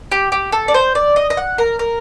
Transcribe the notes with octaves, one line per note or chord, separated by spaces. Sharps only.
G4
G4
A4
D5
C5
D5
D#5
D#5
F#5
A#4
A#4